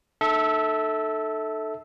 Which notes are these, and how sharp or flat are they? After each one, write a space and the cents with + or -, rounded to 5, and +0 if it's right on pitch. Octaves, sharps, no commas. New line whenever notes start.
D#4 -40 A4 +0 E5 -25